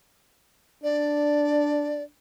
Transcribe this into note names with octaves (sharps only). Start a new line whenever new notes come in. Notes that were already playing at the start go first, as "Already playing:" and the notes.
D4 D5